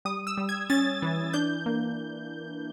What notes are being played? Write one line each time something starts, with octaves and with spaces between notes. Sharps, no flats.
G3 D#6
E6
G3
G#6
C#4 A6
E3
D4 G6
A#3